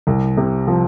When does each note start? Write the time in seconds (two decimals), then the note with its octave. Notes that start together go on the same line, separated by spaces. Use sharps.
0.07 C2
0.37 C3
0.67 F3